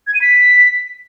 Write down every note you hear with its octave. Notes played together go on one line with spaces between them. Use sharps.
G#6
D#7
B6